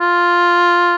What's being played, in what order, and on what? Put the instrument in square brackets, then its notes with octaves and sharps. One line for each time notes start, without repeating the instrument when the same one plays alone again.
[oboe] F4